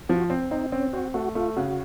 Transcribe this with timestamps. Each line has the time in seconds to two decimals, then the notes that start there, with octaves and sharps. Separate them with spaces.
0.09 F3 F#4
0.30 C4
0.51 C4 D#4
0.72 C4 C#4
0.93 C4 F#4
1.14 A3 F#4
1.35 A3 F4
1.56 C#3 F#4